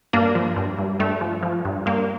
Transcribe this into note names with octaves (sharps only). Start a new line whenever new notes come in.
G2 A#3 D4
F3
G2
G2
G2 A3
F3
F3
G2
G2 A#3